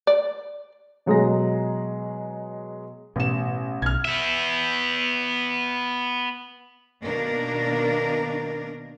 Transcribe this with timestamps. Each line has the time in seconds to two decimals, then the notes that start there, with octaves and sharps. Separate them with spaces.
0.07 D5
1.06 B2 F#3 G#3 G#4 A#5 A#6
3.16 A1 B2 E7
3.82 B1 F6 G#6
4.05 B3 E5
7.03 B2 D#3 A#3 D4 A#4